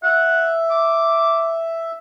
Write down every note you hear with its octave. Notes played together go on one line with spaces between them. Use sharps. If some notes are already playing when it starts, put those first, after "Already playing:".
E5 F#5
D6